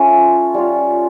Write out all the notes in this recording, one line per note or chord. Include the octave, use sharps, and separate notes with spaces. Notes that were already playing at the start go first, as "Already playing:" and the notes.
Already playing: A3 C#4 F4
G3 C#4 F4